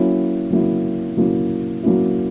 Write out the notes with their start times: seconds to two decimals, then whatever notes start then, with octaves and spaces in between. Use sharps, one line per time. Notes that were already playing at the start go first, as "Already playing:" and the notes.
Already playing: F#3 A#3 C#4 E4
0.50 F#3 A#3 C#4 E4
1.17 F#3 A#3 C#4 E4
1.83 F#3 A#3 C#4 E4